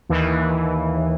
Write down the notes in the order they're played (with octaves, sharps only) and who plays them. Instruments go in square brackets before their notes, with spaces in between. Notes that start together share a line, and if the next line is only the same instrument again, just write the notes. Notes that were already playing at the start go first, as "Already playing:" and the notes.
[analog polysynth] D#2 E3